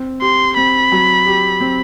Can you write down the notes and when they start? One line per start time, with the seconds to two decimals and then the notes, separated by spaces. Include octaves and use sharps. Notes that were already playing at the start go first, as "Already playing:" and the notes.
Already playing: C4
0.22 G4 C6
0.57 C4 B5
0.92 F#3
1.26 G4
1.61 C4